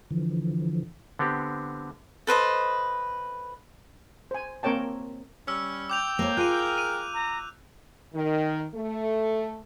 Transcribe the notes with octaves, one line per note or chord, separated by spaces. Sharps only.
D3 E3 F3
D3 B3 C4 G4
A4 B4 C5 D#5
C5 G#5
A#3 C4 A#4 C#5 G5 A5
G3 C#4 E6
G5 D6 G6 F7
F2 A#3 C#5
F4 G#4 A#4 F#6 D#7
D#7
A#5
D#3
A3